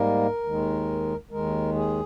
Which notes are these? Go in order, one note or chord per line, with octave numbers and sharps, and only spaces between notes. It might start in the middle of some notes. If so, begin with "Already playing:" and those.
Already playing: G#2 G3 A#3 A#4
D#2 D#3 G#3
D#2 D#3 G#3 A#4
G#4